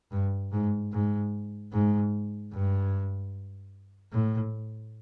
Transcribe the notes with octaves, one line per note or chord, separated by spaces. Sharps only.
G2
G#2
G#2
G#2
G2
A2